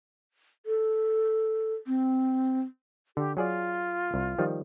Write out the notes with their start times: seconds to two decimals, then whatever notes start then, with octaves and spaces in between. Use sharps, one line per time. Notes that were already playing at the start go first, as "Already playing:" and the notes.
0.66 A4
1.87 C4
3.17 D3 G4
3.37 F#3 F4 G#4 D5
4.14 C2
4.39 D#3 F3 G3